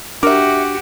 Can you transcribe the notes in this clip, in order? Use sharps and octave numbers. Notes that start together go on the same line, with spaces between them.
D4 F#4 G4 A#4 E5 D6